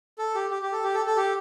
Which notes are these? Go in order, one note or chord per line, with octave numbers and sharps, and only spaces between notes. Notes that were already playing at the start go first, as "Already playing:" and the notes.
A4
G4
G4
G4
A4
G4
A4
A4
G4